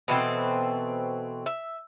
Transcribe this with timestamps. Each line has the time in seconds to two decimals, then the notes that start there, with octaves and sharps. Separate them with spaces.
0.08 B2 E3 C4 A4
1.46 E5